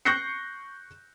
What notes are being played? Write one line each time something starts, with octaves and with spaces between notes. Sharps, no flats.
C#6 F#6 G6 A#6 C7 C#7